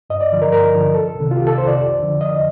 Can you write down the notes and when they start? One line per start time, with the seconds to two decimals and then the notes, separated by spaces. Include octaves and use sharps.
0.10 G2 D#5
0.21 D5
0.31 D3 F3
0.42 A#4
0.52 G2 A#4
0.73 D3 F3
0.94 C2 A4
1.15 C3 D#3
1.31 F4
1.37 C2 G4
1.47 A4
1.57 C3 D#3 C5
1.68 D5
1.78 F2
2.00 D3 F3
2.20 F2 D#5